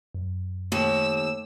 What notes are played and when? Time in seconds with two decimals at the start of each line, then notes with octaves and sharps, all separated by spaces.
0.15 F#2
0.72 D#2 A3 E6